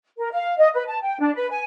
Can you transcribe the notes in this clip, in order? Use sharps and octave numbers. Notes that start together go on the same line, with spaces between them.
A#4
F5
D#5
B4
A5
G5
D4
B4
G#5